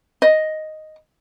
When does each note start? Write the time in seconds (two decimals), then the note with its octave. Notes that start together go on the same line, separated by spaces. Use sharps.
0.22 D#5